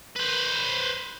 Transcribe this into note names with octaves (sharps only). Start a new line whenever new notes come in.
B4 C5